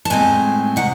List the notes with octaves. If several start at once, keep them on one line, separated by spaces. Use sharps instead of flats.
A5
A2 G#3 C4 G#5
C3 D#3 F#5